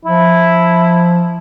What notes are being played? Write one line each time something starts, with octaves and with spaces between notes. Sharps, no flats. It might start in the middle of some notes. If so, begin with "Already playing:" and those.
F3 E4